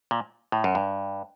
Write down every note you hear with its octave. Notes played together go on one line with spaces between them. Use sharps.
A#2
A2
F#2
G2